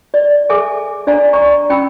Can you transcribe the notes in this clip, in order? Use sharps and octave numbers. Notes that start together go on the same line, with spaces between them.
D5
G#4 A4 E5 G#5 D6
D4 D5 F5 G#5 A#5
D5 A#5 C#6
C#4 G5 B5 E6